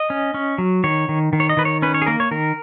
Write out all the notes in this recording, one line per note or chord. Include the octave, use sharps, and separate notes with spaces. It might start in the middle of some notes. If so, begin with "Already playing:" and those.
Already playing: D#5
C#4
C#4
F#3
D#3 C#5
D#3
D#3
C#5
D#5
D#3 B4
C#5
C#4 B4
C#5
G#4
A#3 A#4
C#5
D#3 A#4